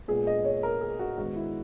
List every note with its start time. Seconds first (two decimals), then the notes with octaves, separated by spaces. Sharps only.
0.08 A#2 G#3 B3 G#4
0.27 D#5
0.45 C#5
0.63 A#4
0.81 G#4
0.99 F#4
1.17 G#2 D#3 G#3 B3 F#4
1.36 E4